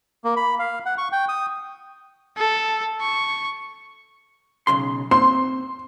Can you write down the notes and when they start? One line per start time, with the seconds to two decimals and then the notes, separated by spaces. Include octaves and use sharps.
0.25 A#3
0.37 B5
0.59 F5
0.86 F#5
0.98 C#6
1.12 G5
1.29 D#6
2.38 A4
3.01 C#6
4.67 B1 C#3 C6
5.11 C4 C5 C6